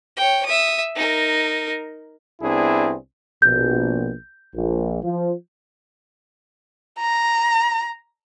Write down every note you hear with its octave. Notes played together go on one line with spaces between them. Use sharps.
C#5 G5
E5 D#6
D#4 A#4
C2 B3 C4 D4 E4 G#4
A#1 B2 G6
A#1
F3
A#5